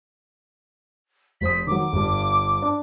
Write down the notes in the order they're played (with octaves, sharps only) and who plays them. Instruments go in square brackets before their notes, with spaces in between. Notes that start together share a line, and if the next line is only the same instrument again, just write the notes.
[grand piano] F1 C5 D#6 [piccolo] B6
[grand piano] D#3 F#3 [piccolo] D6
[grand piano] G1 G2
D4